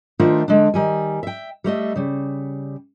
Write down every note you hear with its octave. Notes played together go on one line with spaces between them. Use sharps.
D#3 A3 D4 F4 C5 E5
D3 G#3 D4
D#3 G3 G#5
E5 G5
G3 A3 D#5 E5
C#3 G3